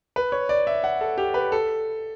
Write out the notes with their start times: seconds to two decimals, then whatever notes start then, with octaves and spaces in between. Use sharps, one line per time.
0.16 B4
0.32 C#5
0.49 D5
0.67 E5
0.84 F#5
1.01 A4
1.18 G4
1.34 B4
1.52 A4